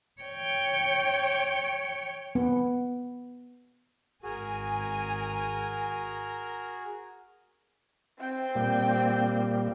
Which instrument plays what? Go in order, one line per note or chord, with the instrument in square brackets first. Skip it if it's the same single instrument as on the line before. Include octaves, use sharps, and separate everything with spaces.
[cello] C#5 G5
[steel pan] B3
[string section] G#1 G#5 [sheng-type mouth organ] F#4 G#4 [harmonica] A#4
[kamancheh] C4 G5
[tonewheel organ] A#2 G3 A#3